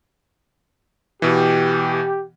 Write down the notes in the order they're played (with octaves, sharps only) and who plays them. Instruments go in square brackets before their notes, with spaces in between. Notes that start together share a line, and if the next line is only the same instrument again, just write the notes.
[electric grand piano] B2 E3 [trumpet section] G4